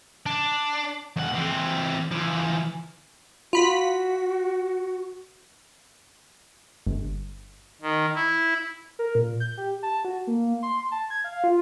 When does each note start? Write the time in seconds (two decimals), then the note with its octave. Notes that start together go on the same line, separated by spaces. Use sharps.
0.26 D4
1.16 F2 F#5
1.34 E3 C4
2.11 E3 F3
3.53 F4 F#4 B5 B6
6.87 G1
7.82 D#3
8.14 E4
8.99 A#4
9.15 A#2
9.40 G6
9.58 G4
9.83 A5
10.05 F#4
10.27 A#3
10.63 C6
10.92 A5
11.10 G#6
11.24 F5
11.44 F4